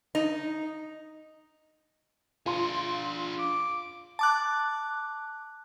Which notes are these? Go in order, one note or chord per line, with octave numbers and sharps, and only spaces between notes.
D#4
D4 F4 G#4 C6
D6
A5 D6 F#6